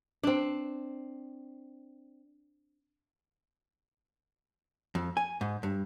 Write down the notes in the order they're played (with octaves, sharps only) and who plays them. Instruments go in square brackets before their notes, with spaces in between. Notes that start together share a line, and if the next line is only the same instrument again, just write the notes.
[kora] C4 D4
[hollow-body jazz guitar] F2
G#5
G#2
G2